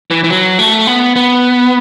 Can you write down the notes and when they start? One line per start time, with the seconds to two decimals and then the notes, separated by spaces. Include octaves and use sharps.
0.11 E3
0.24 E3
0.30 F#3
0.59 A3
0.87 B3
1.16 B3